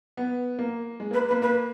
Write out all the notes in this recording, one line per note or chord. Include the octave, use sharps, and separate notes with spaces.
B3
A#3
G#3
A#3 B4
B4
A#3
A#3 B4